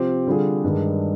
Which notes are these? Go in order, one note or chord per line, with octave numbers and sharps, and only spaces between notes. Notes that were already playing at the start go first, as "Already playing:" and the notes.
Already playing: C3 F3 C4 G4
D3 G3 D4 F4 G#4
G2 D#3 G#3 D4